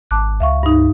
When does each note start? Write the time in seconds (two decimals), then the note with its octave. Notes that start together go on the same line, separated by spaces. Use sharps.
0.11 G#1 A5 D6 F#6
0.40 C#2 E5 F5 C#6
0.63 G2 D#4